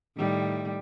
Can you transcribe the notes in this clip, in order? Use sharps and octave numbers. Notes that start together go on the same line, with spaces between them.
A2 D#3 G3